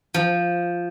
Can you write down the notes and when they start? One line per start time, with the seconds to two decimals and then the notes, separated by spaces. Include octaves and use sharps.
0.14 F3